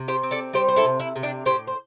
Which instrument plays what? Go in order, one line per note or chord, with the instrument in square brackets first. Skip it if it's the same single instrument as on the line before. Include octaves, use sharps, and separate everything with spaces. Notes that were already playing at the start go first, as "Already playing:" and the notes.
Already playing: [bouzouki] C3
G4 C5
C4
A4 D5
G3 G4 C5
C5
E4 A4
C3
E4
C3
D4 G4
A2 G4 C5
C5